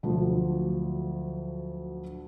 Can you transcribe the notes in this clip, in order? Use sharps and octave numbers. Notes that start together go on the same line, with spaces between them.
D2 F3 F#3